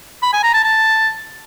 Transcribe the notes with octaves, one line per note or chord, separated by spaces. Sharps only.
B5
G#5
A#5
A5
A5